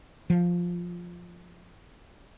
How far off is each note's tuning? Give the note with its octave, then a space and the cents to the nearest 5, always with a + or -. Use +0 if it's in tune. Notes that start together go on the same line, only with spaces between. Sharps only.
F3 +5